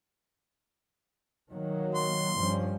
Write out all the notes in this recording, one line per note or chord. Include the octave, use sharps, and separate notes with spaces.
D#3 F#3 A#3
C6
G2 F3 C#4